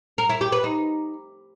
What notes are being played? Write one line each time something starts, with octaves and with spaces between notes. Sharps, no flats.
A#4
E4
G4
B4
D#4